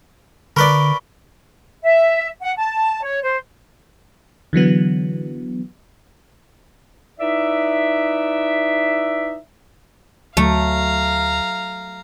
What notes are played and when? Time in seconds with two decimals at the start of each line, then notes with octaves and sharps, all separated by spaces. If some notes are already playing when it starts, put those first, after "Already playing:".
0.56 D3 A#4 B4 D5 B5 C#6 G7
1.83 E5
2.42 F#5
2.57 A5
3.03 C#5
3.23 C5
4.53 D3 E3 F#3 B3
7.19 D#4 E4 B4 D5 E5
10.37 D2 F#3 A3 F5 A#5